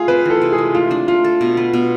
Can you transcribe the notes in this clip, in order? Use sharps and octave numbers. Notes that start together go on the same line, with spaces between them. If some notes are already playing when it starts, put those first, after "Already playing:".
Already playing: A3 F4 G#4
C4 B4
E3 A4
C3
G#4
G#3
A3 F4
D4
A3 F4
A4
B2
B3
B2